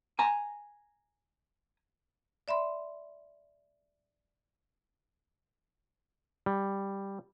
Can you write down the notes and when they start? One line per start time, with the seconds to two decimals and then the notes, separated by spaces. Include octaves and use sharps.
0.19 G#5 A#5
2.48 D5 E5 B5 C6
6.46 G3